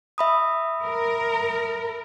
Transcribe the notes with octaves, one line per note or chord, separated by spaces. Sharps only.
E5 B5 D#6
A#4